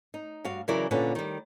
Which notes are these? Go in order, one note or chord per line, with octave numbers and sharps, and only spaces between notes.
D#4
G2 F#4 F5
C#3 E3 F#3 E4 A#4 D5
A#2 D3 C#4 B4
D#3 G3